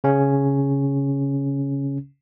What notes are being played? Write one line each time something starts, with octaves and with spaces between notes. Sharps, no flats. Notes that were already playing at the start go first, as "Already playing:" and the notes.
C#3 C#4